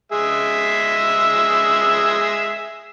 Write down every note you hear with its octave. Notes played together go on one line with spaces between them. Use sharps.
G#3 G#4 E5